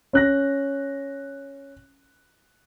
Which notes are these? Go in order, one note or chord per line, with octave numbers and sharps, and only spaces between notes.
C#4 F#6 A#6